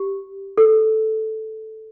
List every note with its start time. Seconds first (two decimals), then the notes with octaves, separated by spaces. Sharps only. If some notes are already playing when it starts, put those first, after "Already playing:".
Already playing: G4
0.58 A4